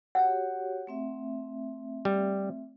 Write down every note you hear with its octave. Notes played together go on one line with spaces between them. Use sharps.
F#4 G4 C#5 F#5
A3 C4 E5
G3